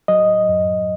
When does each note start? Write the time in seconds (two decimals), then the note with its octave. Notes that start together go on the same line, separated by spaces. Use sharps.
0.08 F#3 D#5
0.49 F#2